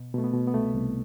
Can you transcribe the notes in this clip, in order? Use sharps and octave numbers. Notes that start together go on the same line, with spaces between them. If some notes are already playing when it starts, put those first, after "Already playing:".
Already playing: B2
B2 A3
B3
B2
B3
C2 A3
C2